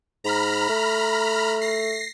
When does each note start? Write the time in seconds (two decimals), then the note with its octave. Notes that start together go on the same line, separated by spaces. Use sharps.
0.24 G#2 A#5 B5 F6
0.69 A3
1.61 A#6 C7